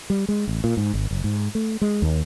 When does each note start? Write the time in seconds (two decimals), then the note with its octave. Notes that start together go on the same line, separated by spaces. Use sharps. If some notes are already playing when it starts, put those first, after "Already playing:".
0.10 G3
0.29 G#3
0.48 A1
0.64 A#2
0.77 G#2
0.94 G#1
1.11 F#1
1.24 G#2
1.55 A3
1.81 G#3
2.02 D#2